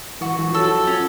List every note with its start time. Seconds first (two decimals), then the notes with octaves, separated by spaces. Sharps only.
0.21 E3 F#4
0.39 E3
0.47 F3
0.54 F#3 A4
0.87 F3 C#4